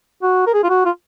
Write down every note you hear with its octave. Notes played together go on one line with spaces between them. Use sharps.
F#4
A#4
G#4
F4
F#4
F4